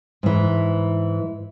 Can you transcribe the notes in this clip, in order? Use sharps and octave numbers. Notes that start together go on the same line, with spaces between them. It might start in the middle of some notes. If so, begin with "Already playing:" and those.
G#2 E3